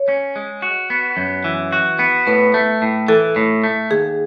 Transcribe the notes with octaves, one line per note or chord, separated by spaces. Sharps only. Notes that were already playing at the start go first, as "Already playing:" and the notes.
Already playing: C#5
C#4
G#3
F#4
B3
F#2
E3
F#4
B3
A2 B4
A3
A2
E3 A4
A2
A3
D#2 G#4